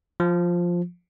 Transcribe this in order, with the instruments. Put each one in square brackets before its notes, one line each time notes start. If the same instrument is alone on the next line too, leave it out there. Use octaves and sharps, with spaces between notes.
[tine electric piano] F3